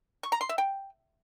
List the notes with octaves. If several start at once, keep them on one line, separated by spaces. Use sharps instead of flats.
C#6
A#5
C6
E5
G5